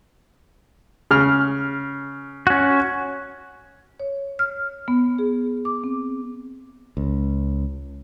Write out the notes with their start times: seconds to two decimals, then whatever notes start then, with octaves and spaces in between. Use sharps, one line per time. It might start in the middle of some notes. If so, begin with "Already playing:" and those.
1.11 C#3 F6
2.47 C#4 F#4
4.00 C#5
4.39 F6
4.88 B3
5.19 G#4
5.65 D6
5.84 C4
6.97 C#2